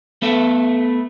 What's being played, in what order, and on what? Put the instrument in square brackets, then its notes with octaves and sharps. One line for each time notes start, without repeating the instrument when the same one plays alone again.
[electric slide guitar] A3 B3 A4 E5